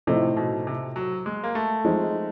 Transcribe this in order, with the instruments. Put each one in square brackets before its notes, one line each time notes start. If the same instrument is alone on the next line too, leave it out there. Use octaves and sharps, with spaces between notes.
[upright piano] A2 F3 A3 C4 D#4 [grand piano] C3
[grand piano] B2
C3
F#3
G#3
A#3
A3
[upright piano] F3 G#3 C4 D#4